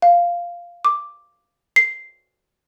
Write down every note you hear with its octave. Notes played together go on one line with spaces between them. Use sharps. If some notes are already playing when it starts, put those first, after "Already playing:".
F5
D6
C7